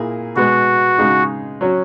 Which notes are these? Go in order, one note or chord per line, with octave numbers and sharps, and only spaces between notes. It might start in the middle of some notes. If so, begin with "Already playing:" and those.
Already playing: A#2 A#3 E4 G#4
B2 G#3 B3 F#4
C#3 G#3 D#4 G#4
F#3 C#4 F#4